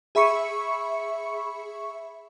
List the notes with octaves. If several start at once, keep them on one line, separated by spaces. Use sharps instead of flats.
G#4 E5 B5 C#6 C#7